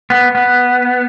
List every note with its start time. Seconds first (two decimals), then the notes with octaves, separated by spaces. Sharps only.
0.10 B3
0.35 B3